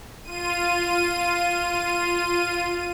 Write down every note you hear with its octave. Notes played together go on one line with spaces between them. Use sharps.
F4 D#7